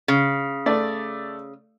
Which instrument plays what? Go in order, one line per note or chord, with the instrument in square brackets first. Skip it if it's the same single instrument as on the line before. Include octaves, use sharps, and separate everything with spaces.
[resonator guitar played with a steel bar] C#3
[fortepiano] A3 D5